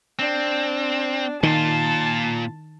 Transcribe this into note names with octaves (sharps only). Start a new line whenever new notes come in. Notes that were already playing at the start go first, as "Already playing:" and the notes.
C4 D4
A#2 D#3 F4 A5